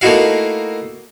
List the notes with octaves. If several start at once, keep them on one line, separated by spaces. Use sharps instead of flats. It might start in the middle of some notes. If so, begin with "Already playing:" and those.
A3 A#3 D#4 E4 F#4 F5